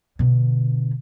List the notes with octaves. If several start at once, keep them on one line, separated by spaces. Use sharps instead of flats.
B2 D3